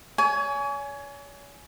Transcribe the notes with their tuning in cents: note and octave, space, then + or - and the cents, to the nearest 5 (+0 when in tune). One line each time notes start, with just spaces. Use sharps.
C#5 +40 G#5 +15